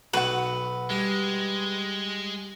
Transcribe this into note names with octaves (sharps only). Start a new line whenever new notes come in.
B1 F#4 B4 F#5
G3 G#3